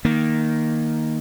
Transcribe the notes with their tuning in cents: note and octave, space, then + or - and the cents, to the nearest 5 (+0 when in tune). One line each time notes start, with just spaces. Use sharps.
D#3 +0 A#3 +0